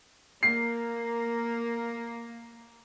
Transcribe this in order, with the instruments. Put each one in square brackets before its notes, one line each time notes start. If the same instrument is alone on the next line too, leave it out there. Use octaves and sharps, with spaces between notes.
[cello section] A#3 [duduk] A#4 [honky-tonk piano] C7